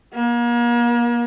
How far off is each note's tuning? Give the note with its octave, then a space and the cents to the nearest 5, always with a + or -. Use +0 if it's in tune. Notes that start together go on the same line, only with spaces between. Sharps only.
A#3 +40